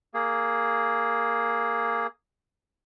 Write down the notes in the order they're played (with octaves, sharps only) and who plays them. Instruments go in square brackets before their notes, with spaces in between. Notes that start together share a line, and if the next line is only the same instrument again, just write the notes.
[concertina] A#3 G#4